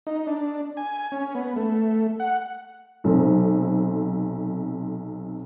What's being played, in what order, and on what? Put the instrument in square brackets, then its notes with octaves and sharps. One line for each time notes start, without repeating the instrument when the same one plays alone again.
[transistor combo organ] D#4
D4
G#5
C#4
B3
A3
F#5
[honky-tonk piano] B1 C3 C4 A4